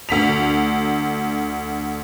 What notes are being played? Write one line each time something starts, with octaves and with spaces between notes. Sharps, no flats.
D2 B6 F7